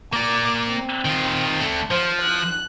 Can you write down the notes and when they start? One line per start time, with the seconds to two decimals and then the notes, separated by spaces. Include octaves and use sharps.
0.13 A#3 D5 D6
0.69 C4
1.05 D#3 F4
1.60 D3 A3
1.91 F3 C5
2.22 F#6